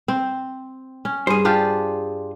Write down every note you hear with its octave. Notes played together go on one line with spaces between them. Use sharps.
C4
C#4
G2 G#4 C5
D4 F4 G4